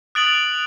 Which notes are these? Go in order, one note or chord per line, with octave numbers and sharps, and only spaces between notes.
D#6 F#6 A6 D7 F#7